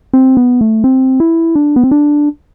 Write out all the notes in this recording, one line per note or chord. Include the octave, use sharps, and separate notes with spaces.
C4
B3
A3
C4
E4
D4
B3
C4
D4